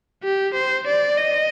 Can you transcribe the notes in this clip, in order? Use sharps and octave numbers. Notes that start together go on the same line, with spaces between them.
G4
C5
D5
D#5